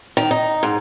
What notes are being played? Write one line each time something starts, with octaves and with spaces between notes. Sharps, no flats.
D#3
D#4
G#2